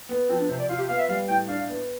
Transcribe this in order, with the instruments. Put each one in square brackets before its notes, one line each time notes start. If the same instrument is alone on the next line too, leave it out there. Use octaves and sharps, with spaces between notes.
[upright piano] B3
[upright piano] F3 [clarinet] C4
[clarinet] D4
[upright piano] C3 [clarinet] C5
[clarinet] D5
[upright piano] F4 [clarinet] F5
[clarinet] G4
[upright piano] B3 [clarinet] F5
[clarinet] E5
[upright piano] G3 [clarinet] F5
[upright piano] A2 [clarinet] G5
[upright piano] D4 [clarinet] F5
[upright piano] B3